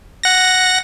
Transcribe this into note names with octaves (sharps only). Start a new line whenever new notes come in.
F#5 A#6